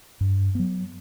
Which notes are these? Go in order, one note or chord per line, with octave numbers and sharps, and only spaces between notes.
G2
F#3 B3